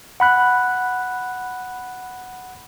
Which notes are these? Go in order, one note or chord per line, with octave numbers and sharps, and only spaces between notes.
F#5 B5 F#6